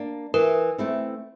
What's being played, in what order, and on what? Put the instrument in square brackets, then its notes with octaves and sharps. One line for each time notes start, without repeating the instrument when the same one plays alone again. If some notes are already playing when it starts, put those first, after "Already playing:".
Already playing: [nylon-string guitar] A#3 D4
[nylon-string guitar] E3 [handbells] A#4
[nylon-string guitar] A3 C4 E4